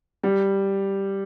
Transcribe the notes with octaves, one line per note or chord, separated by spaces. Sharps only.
G3